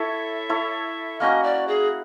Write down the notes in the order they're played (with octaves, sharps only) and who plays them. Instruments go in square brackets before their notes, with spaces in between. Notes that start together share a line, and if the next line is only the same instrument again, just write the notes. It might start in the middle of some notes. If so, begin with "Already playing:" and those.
Already playing: [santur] E4 A4 C#5 [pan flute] E5
[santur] E4 A4 C#5
[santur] A#3 C#4 F#4 [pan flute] D#5
[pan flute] D5
G#4